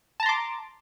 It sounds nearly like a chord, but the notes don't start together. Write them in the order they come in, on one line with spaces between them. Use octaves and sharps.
A5 A#5 C6 D6